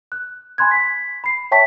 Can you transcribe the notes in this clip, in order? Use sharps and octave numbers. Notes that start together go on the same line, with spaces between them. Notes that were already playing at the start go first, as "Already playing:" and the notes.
F#6
G#5 B5 C6 F#6 G#6
B6
B5 C7
C#5 E5 G5 A5 C#6 B6